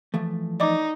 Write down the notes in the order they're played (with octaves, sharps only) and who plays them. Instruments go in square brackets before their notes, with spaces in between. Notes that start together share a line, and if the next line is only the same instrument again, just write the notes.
[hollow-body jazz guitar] E3 F3 A3
[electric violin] D#4 [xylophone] D5 D#5 D6